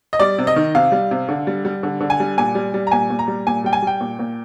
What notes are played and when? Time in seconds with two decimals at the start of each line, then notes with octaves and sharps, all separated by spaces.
0.13 D#5
0.20 G3 D5
0.38 C3
0.47 D#5
0.56 D#3
0.75 C3 F5
0.92 G3
1.11 C3
1.29 D3
1.47 G3
1.65 G3
1.83 D3
2.01 D3
2.10 G#5
2.20 G3
2.38 A#2 G#5
2.55 G3
2.74 G3
2.87 A#5
2.91 A#2 G#5
3.10 A#2
3.19 A#5
3.28 G3
3.47 A#2 G#5
3.64 G3 G5
3.73 G#5
3.82 G3 G5
4.01 A#2
4.19 A#2